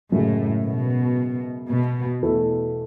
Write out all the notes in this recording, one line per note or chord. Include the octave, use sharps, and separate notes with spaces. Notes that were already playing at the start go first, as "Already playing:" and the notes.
F#2 A2 C#3 G#3
B2
B2
E2 B2 A3 E4